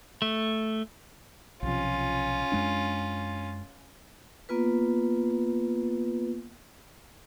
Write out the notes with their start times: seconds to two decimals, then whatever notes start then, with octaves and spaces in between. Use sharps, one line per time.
0.22 A3
1.63 B1 C3 F3 C#4 F4
2.52 F#2 G#3 D4
4.49 A#3 B3 F4 B4